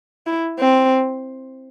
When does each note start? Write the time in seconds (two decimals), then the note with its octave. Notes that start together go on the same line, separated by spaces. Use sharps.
0.27 E4
0.60 C4